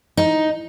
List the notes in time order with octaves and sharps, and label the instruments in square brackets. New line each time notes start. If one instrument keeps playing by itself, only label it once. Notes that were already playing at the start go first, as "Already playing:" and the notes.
[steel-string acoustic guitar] D#4